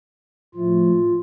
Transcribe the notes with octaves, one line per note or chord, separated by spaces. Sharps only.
A2 F3 A3 F4